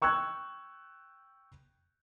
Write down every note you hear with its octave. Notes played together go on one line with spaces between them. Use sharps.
G5 C#6 E6 F#6 G#6